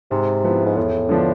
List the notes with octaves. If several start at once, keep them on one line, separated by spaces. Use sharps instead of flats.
G#2 C3
F3 B3 E4
G#2
E2 A2
D3 F3 B3 D4